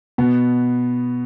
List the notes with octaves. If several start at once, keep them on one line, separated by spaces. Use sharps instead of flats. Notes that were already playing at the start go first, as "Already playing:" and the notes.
B2 B3